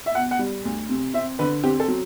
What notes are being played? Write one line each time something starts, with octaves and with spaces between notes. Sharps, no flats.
E5
B2 F#5
F#5
G3
D2
C3
C4 E5
D3 B4
C4 G4
A4
F#3